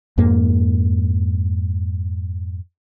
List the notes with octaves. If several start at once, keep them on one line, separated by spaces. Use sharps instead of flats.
F2 G#2 A#3